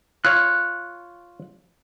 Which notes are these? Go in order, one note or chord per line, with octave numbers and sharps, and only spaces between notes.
F4 C#5 F#6